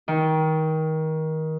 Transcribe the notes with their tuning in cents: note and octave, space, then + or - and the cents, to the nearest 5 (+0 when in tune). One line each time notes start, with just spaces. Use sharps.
D#3 +25 G5 +0